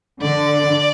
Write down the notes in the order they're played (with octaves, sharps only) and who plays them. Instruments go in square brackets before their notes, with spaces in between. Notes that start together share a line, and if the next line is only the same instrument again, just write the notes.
[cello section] D3 [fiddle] D5